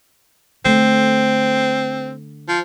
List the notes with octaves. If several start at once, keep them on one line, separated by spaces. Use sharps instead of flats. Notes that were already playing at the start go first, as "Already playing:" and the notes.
D3 A3 C4
F3